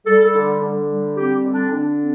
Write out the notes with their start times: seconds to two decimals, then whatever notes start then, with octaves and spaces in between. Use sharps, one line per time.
0.06 G3 A4
0.24 A4
0.34 D3
0.62 D3
0.89 G3
1.17 C4 G4
1.43 D3
1.53 D4
1.71 D3 D4
1.99 C4